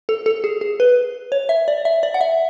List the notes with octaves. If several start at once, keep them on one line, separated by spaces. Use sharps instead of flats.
A4
A4
G#4
G#4
B4
C#5
E5
D5
E5
D5
F#5
E5